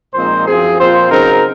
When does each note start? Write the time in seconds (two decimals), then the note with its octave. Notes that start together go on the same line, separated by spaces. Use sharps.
0.14 A#2 F3 G#3 C4 D#4 C5
0.47 F#2 F3 C4 G#4
0.78 A#2 F3 C4 F4 C5
1.10 C#3 F#3 C4 D#4 A#4